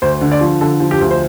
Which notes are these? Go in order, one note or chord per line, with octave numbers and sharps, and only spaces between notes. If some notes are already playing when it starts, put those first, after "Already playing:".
D2 C5
D3
D5
F3
D3 A4
F3
G4
D2
C5